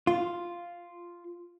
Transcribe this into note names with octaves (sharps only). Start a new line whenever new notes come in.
F4